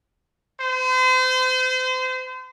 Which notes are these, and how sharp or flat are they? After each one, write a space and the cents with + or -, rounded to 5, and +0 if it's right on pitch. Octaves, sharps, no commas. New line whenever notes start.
C5 -35